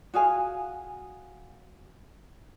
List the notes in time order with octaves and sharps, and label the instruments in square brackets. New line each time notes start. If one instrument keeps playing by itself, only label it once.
[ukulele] F#4 G#4 F5 G#5